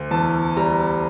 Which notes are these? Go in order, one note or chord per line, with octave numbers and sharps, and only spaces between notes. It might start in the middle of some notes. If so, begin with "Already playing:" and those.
Already playing: D2
E2 A5
G3 A#5